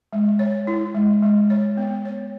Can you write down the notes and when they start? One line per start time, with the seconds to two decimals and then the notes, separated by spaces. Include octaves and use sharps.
0.13 G#3
0.39 C#5
0.67 E4
0.94 G#3
1.22 G#3
1.50 C#5
1.77 B3
2.05 C#5